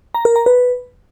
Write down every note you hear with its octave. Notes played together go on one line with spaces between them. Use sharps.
A#5
A#4
A#5
B4